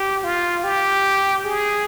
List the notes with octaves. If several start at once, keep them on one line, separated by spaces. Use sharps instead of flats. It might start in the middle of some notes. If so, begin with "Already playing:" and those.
Already playing: G4
F4
G4
G#4